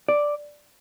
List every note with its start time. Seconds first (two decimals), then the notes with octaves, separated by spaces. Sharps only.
0.09 D5